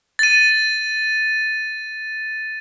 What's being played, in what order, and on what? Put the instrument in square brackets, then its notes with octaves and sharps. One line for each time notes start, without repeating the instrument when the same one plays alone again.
[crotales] A6 D#7